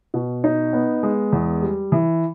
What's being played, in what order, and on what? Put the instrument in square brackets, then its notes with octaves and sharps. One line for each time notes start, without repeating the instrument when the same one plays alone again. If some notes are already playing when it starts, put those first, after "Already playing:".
[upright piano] B2
D#4
B3
G#3
E2
G3
E3